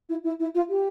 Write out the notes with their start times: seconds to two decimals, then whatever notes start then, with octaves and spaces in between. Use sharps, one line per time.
0.09 E4
0.24 E4
0.39 E4
0.54 F4
0.69 G4